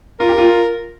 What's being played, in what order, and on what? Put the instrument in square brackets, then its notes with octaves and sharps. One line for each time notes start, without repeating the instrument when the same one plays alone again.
[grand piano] F4 [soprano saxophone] A#4
[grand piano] G4
F4